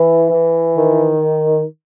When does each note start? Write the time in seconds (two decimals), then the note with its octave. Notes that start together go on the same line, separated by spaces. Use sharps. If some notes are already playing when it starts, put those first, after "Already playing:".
Already playing: E3
0.31 E3
0.76 D#3